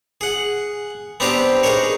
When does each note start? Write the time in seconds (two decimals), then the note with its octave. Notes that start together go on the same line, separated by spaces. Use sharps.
0.21 G#4 F#5
1.20 B3 C4 D4 G4 C5 A#5
1.63 D#4 G#4 A#4 C#5